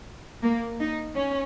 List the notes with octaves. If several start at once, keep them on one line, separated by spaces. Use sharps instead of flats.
A#3
D#4
C#4